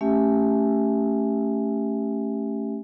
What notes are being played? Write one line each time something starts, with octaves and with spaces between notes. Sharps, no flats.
A3 C#4 G4 E5 G#5